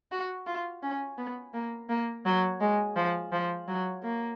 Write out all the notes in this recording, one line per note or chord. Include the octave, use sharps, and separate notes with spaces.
F#4
F4
C#4
B3
A#3
A#3
F#3
G#3
F3
F3
F#3
A#3